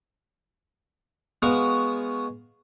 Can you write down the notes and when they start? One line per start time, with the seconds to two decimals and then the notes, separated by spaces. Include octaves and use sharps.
1.42 G#3 B3 F#4 F5 C#6